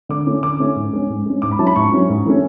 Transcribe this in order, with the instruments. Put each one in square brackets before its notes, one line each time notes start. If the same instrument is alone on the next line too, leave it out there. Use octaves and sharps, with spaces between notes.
[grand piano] D3 D6
A3 C#4 E4
D3 D6
A3 C#4 E4
G#2
G#3 C#4
G#2
G#3 C#4
G#2 D6
B5
F#3 C#4 E4 A5
B5
G#2 C#6
F#3 C#4 E4
G#2
E3 A3 C#4